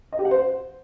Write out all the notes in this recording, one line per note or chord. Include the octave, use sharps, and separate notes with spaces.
D#5
G4
F#5
C5